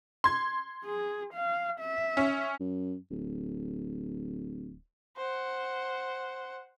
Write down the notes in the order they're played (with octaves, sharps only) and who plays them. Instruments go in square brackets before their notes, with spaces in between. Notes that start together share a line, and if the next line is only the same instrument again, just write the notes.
[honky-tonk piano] C6 G#6
[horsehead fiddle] G#4
F5
E5
[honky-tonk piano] C#4
[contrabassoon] F#2
D1
[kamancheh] C5 F#5